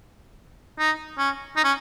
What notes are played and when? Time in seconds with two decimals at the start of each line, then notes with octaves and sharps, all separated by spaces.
0.79 D#4
1.18 C#4
1.57 D#4
1.64 C#4